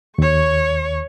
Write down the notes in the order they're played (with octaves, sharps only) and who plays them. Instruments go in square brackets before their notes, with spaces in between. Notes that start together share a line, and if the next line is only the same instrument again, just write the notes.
[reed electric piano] D#2 [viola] C#5 C#6